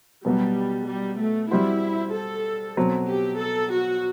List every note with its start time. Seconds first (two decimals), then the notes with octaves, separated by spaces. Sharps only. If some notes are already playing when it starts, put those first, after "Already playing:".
0.25 B2 F#3 G3 B3 F#4
0.88 G3
1.19 A3
1.51 G3 C4 E4 F#4 C5
2.14 A4
2.77 B2 F#3 C4
3.09 G4
3.40 A4
3.72 F#4